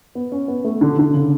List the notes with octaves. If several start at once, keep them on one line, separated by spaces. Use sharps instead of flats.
B3
C#4
B3
A3
D3
D3
C#3